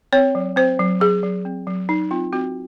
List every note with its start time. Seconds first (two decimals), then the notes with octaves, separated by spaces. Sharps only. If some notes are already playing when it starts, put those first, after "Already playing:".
0.13 C4 C#5
0.35 F#3
0.56 C4 C5
0.79 F#3
1.00 F#3 G#4
1.23 F#3
1.45 C4
1.67 F#3
1.89 F#3 D#4
2.11 C4 F4
2.33 C4 F#4